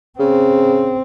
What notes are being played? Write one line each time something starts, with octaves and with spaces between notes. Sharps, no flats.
C#3 C4